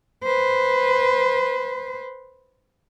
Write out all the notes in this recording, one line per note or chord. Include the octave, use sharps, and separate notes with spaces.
B4 C5